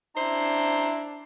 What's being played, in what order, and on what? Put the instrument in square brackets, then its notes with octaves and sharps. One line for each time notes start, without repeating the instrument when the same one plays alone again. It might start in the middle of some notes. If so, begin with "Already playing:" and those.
[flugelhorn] D4 [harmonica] E4 A#5 [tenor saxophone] C5